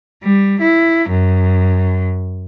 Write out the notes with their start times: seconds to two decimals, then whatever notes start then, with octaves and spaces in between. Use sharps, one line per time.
0.24 G3
0.61 E4
1.09 F#2